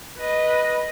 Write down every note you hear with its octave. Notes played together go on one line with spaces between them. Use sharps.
B4 D#5